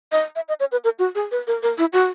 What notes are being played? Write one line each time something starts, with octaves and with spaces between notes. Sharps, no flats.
D#5
E5
D#5
C#5
B4
A#4
F#4
G#4
B4
A#4
A#4
E4
F#4